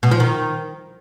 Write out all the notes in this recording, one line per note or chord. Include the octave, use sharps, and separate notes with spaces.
B2
F3
D#3